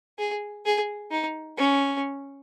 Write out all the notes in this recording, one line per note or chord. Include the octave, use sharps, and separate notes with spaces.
G#4
G#4
D#4
C#4